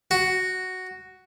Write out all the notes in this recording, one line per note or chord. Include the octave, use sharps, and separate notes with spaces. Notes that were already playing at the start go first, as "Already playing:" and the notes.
F#4